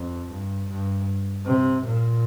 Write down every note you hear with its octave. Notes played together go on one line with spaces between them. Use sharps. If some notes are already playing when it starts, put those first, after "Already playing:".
Already playing: F2
G2
G2
C3
A#2